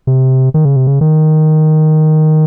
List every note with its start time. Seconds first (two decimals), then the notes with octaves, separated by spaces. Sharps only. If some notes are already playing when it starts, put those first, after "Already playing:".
0.07 C3
0.54 D#3
0.65 C#3
0.76 C3
0.87 C#3
1.01 D#3